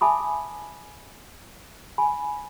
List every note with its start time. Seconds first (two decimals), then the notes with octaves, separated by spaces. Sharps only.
0.01 E5 G#5 A5 B5 D6 D#6
1.98 G#5 B5